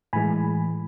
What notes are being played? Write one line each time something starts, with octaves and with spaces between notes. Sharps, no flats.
A2 E3 G#3 G#5 B5